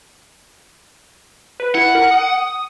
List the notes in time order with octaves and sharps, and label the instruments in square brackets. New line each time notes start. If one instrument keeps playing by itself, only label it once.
[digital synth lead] B4
[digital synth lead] E4 [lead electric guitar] F#5
[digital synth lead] A#4
D#6